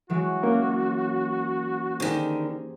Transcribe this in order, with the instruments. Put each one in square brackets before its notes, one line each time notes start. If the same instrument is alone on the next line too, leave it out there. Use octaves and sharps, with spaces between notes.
[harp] E3 F#3 G#3 [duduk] F#4
[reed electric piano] A#3 C#4 A#4
[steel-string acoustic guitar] D3 D#3 [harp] G4 G#4 C5